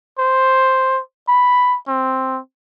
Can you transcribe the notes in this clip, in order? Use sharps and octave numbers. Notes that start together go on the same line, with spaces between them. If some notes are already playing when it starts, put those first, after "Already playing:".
C5
B5
C4